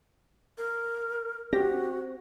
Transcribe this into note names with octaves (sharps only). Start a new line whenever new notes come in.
A#4
C4 F#4 G4 A#6